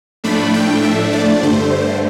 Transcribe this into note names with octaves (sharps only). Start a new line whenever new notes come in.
A2 F3 A3 D4 B5
G5
E5
D5
G2 D3 A3 C5